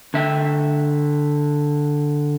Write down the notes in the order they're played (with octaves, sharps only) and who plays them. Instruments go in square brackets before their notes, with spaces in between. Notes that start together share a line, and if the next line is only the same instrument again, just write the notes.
[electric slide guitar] D3 E5 G5